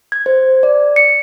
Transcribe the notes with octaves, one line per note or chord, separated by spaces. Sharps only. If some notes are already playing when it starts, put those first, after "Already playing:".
G#6
C5
D5
C#7